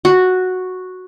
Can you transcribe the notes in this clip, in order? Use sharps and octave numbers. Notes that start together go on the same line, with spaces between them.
F#4